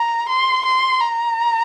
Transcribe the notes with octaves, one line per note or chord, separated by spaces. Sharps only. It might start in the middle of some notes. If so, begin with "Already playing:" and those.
Already playing: A#5
C6
C6
A#5